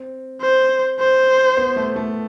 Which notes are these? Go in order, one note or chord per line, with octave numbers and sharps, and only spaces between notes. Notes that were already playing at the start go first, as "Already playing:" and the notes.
Already playing: C4
C5
C5
B3
A3
A3